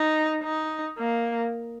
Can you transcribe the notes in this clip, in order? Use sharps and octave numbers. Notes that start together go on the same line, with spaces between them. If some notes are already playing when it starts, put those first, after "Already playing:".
Already playing: D#4
D#4
A#3